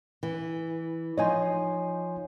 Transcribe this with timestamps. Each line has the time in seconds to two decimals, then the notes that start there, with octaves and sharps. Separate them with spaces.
0.23 E3
1.18 F3 D#4 C#5 D#5 G#5 C6